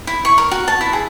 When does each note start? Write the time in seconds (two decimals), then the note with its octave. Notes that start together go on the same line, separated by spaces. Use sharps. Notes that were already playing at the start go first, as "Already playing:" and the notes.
0.07 E4
0.25 C#6
0.38 A#4
0.51 F#4
0.68 A5
0.81 E4
0.93 G#4